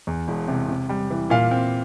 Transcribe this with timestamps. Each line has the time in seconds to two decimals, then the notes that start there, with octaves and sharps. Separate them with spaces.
0.07 E2
0.28 E1
0.48 C3
0.69 C3
0.89 G3
1.10 E3
1.30 A#2 F5
1.51 C4